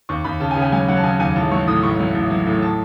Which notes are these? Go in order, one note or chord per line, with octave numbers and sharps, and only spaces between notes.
D#2 C#6
D#2 B5
C#3 A5
G#5
C#3
G#5
F#3 G#5
F#3 F#5
A5
C#3 G#5
D#2 G#5
A1 A5
F#3 C#6
A2 D#6
A1 C#6
F#3
A1
F#3
A2
A5